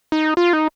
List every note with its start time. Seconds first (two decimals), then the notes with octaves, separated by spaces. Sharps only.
0.12 D#4
0.37 F4
0.53 D#4